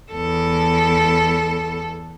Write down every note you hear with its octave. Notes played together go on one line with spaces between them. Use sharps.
E2 A4